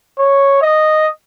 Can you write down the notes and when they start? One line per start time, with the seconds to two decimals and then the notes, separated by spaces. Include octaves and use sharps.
0.18 C#5
0.62 D#5